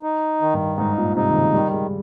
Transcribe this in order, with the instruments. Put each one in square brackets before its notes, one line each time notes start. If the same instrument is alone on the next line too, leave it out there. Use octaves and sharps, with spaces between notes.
[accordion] D#4
D#3
[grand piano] G2
[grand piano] G#2 [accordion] D#4
[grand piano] A#2
[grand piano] C3 [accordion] D#4
[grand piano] D#3
C#3
[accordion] D#3 [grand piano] G3
[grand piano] G#3